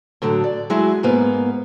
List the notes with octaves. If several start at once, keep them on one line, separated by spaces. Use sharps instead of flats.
A2 D3 F#3
D5
F#3 G#3 E4 G#4
G#2 A#3 B3